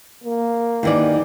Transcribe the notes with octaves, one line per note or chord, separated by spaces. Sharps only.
A#3
D#2 E3 D5